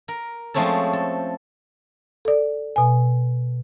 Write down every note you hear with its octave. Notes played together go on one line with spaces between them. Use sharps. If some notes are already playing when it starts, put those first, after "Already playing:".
A#4
F3 G#3 A3 C4 C#4 A4
A4
A4 D5
B2 G#5